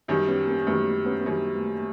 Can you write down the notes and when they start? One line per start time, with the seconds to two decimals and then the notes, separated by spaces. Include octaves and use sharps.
0.08 F#2 D#3 G3 B3 C#4
0.28 B3 C#4
0.48 A#3 C4
0.67 F#2 D#3 G3 A3 B3
1.06 B3 C#4
1.20 B3
1.26 F#2 D#3 G3 A#3 C4
1.55 A3 B3